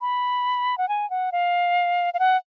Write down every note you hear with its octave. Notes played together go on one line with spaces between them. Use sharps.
B5
F#5
G#5
F#5
F5
F5
F#5